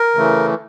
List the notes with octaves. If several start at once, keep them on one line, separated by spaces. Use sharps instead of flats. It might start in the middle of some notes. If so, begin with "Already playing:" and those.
Already playing: A#4
C#3 E3 A3